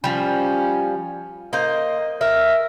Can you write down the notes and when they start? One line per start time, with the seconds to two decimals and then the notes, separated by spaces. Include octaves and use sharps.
0.04 F3 G3 C#4
1.53 A#3 C5 D#5
2.21 A#4 E5